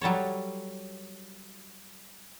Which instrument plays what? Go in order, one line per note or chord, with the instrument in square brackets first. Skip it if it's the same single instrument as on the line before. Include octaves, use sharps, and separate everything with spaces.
[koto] F#3 G3 A4 C#5